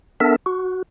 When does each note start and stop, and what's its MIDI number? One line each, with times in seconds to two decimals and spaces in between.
0.20 0.36 59
0.20 0.36 62
0.20 0.36 69
0.20 0.36 70
0.20 0.36 76
0.46 0.82 66